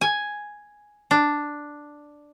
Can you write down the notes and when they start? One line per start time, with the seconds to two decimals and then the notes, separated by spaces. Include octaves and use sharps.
0.01 G#5
1.11 D4